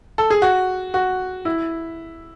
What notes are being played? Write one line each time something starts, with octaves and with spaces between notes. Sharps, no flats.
A4
G#4
F#4
F#4
E4